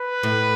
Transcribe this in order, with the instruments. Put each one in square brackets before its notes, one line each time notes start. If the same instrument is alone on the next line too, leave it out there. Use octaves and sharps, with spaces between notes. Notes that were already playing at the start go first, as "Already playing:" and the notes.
Already playing: [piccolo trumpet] B4
[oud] A2